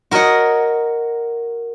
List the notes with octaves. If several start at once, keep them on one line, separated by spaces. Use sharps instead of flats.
F#4 A#4 C#5 D#5 F#5